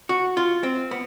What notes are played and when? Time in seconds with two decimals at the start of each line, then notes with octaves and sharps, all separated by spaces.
0.09 F#4
0.37 F4
0.63 C4
0.91 B3